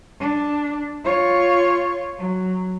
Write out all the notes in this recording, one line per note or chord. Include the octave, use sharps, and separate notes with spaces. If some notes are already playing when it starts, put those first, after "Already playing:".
D4
F4 C#5
F#3